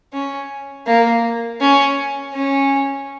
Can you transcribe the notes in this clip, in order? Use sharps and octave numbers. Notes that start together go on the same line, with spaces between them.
C#4
A#3
C#4
C#4